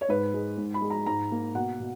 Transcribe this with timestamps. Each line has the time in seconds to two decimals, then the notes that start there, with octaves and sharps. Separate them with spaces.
0.01 C#5
0.09 G#2 B4
0.34 G#3
0.57 G#2
0.74 B5
0.82 G#3
0.90 A#5
1.06 G#2 A#5
1.31 A#3
1.55 B2 F#5
1.80 B2